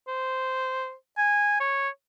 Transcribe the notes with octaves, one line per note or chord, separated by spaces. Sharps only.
C5
G#5
C#5